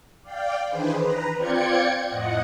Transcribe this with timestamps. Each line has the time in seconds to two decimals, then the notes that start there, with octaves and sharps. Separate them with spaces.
0.23 D5 F5 G5
0.69 D#3 E3 D4 G#4 B4 C5
0.99 B4 A#5
1.36 C4 F4 D5 G5 G#6 C#7
2.07 F2 A2 D#5 F#5